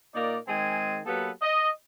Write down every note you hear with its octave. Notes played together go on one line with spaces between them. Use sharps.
A#2 A#3 D#4 A#4 D5
D#3 G#3 C4 G#4 G#5
F#3 A#3 B3 G4 A4 B4
D#5